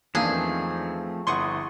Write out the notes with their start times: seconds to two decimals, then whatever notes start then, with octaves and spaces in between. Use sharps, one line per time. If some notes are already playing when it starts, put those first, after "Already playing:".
0.15 E2 D#3 F3 A3 A#3 C4 D4 G#4
1.27 G1 E4 F#5 C6 C#6 D#6